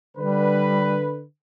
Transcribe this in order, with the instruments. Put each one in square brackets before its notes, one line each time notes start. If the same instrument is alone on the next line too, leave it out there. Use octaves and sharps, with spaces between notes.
[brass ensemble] D3 B4 [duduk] G3